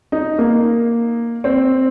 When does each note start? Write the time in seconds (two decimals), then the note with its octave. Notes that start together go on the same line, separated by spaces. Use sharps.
0.12 D#4
0.39 A#3
1.44 C4